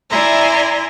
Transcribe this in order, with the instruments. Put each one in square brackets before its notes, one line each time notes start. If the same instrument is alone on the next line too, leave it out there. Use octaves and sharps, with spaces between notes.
[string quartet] E4 D5 E5 G#5 A#5 C6